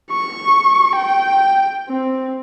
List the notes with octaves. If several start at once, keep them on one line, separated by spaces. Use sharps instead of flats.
C#6
G5
C4